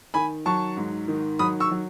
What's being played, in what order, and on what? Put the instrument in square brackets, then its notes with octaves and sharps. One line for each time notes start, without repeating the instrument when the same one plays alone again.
[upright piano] D#3 G#5 B5
F#3 A5 C#6
G#2
D#3
F#3 B5 D#6
C#6 E6
F#3